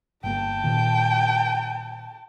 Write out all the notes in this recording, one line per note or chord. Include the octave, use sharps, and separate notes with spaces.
G1 A#3 G5 A5
A#2 D#3